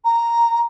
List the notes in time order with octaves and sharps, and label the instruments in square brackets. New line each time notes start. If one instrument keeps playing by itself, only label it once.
[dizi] A#5